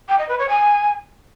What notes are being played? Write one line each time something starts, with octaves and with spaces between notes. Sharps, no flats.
G5
D#5
B4
C#5
G#5